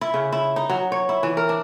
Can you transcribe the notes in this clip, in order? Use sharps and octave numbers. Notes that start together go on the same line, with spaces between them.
E4
C#3
E4
D#4
F#3
C#5
E4
E3
A#4
D4